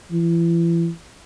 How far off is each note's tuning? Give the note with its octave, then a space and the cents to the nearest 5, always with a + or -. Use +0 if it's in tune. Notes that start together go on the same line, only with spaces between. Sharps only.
E3 +35